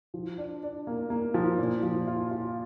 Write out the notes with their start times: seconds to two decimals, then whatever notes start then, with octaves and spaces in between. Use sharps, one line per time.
0.14 F3
0.38 D4
0.63 D4
0.87 A#3
1.10 A#3
1.34 F3
1.58 A#2
1.83 F3
2.07 F4
2.31 F4